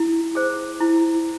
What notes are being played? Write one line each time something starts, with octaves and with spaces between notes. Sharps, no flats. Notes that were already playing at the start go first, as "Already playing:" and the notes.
Already playing: E4
G#4 C5
E4